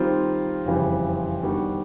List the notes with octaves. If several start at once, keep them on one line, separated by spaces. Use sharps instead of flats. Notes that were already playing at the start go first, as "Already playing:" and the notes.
Already playing: D#3 G3 C4 F4
F#1 F2 C#3 E3 G3
D#3 G3 B3 D4 F#4